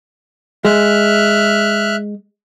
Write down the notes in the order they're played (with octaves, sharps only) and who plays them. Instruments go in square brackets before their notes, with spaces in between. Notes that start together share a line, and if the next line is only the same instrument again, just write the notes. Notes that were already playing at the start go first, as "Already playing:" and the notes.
[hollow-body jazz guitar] G#3 [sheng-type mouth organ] E5 F6 F#6